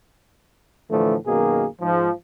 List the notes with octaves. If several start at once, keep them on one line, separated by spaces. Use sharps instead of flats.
A2 D3 E3 F3 A3
F#2 B2 D#3 A#3 G#4
G#2 F3